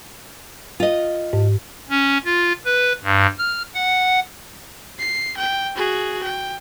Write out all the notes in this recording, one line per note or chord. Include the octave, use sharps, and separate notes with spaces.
F4 D#5
G#2
C#4
F4
B4
G2
F6
F#5
C7
G5
F#4 G#4
G5